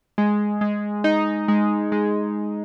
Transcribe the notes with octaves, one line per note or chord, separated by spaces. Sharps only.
G#3
G#3
D#4
G#3
G#3